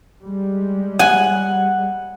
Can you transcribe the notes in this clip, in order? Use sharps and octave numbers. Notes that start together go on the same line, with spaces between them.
G3 G#3
F#5 G#5